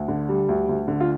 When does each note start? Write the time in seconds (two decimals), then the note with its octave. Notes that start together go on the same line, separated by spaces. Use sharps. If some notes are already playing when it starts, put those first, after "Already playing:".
Already playing: D2
0.08 D3
0.29 G3
0.49 D2
0.69 D2
0.88 D3
1.00 F4